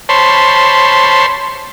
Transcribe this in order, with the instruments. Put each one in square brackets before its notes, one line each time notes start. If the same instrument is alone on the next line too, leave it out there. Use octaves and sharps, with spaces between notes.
[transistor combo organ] C5 C#5 A5 B5 C6